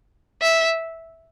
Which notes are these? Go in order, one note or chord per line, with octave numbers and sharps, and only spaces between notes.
E5